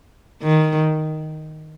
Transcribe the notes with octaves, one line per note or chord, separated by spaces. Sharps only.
D#3